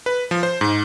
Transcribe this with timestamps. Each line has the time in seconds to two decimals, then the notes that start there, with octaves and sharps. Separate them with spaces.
0.06 B4
0.31 F3
0.43 C5
0.61 G#2